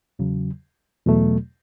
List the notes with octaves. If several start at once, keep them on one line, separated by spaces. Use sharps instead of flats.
E2 C#3 F#3
E2 B2 F#3 A3